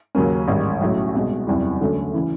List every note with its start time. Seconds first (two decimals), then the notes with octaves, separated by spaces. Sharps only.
0.15 D#2 C#3 F#3 A#3 C#4
0.48 A1 G#2 D#3 G3
0.81 B1 A2 F#3 A3
1.14 C2 B2 G#3
1.47 F#1 E2 C3 E3 G3
1.81 D2 D3 F#3 A3 C#4
2.14 C#3 E3